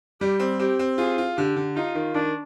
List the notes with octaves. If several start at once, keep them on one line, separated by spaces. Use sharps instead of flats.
G3 G4
C4
C4 G4
C4
F4 G#4
F4
D3 G4
D3
D#4 F4
D#3
D#3 D4